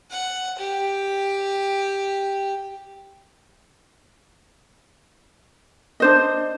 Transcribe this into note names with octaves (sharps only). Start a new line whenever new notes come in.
F#5
G4
D4 C5 D#5